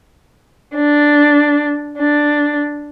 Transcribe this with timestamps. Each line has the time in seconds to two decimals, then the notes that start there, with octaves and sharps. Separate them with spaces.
0.75 D4
1.98 D4